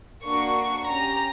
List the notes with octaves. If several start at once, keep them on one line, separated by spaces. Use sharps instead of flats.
A#3 D4 F#4 C#6
C#4 G4 A#5